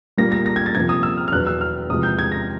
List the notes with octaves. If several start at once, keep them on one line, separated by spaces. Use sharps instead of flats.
A#2 G3 A#3 A#6
A#6
A#6
G#6
A6
C3 F3 A#3 G#6
D#6
E6
F6
F6
E2 B2 F#3 B3 F#6
E6
F6
E2 C3 F3 G#3 D#6
G6
G#6
A#6